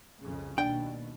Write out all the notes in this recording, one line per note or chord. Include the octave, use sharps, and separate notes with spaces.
C2 F2 C#3
D#2 B2 D4 G5